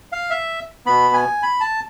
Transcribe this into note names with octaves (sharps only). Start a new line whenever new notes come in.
F5
E5
B2 B3 B5
G#5
B5
A5